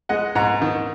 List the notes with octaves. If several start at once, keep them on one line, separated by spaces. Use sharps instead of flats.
G#3 D#5 F#5
G#2 F#5 A#5
D#3